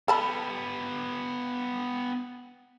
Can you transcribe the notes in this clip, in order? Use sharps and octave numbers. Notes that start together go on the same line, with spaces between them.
B3 G4 A4 A5 B5